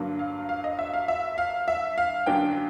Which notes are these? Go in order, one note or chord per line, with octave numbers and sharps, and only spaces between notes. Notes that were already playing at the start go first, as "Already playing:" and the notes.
Already playing: G2 D3 F#3 A#3
F5
F5
D#5
E5
F5
E5
F5
E5
F5
F#2 D3 F#3 A#3 D4 G5